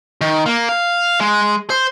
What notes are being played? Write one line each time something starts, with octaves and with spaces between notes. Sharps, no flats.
D#3
A#3
F5
G#3
C5